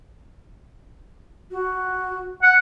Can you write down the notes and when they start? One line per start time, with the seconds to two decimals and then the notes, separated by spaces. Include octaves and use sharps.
1.51 F#4
2.43 F#5